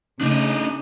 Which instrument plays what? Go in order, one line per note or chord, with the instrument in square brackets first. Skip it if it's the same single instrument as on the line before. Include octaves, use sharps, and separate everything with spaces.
[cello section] C#3 A3 [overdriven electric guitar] D4 D#4